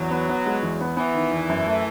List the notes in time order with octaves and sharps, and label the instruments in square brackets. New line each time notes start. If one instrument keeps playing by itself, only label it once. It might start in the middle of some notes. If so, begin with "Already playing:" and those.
Already playing: [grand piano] E2 [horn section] F#3
[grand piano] B3
B3
G#3
E2
B3
[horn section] E3 [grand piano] B3
[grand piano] D#3
E2
F#2
A3